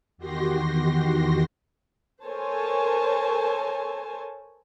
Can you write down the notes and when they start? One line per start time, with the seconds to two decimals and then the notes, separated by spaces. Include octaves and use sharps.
0.18 E2 D#3 F#4 G4 C6 A#6
2.26 A4 A#4 C5 C#5 G#5 A5